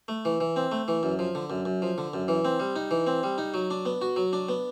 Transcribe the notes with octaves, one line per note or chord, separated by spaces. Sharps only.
A3
E3
E3
C4
A3
E3
F#2
F3
D3
F#2
F#2
F3
D3
F#2
E3
C4
G3
D#4
E3
C4
G3
D#4
F#3
D4
B3
F#4
F#3
D4
B3